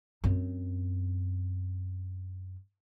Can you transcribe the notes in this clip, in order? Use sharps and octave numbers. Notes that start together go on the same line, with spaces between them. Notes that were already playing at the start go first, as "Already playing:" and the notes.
F#2 C4